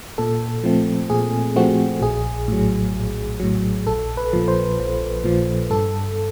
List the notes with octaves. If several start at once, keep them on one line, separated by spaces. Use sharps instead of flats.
A#2 A4
F3 A3 C4
A#2 G#4
F3 A3 C4 F#4
A#1 G#4
A2 F#3
A#1
A2 F#3
A#1 A4
B4
A#2 F3
C5
A#1
A#2 F3
G2 A4